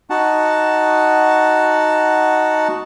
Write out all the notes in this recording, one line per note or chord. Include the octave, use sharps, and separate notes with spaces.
D#4 F#4 F#5 A5